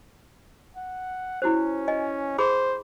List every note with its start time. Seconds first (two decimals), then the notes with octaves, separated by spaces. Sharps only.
0.76 F#5
1.42 C#4 E4 F#4 C5
1.88 D#5 G#5
2.38 G#4 C5 B5 D6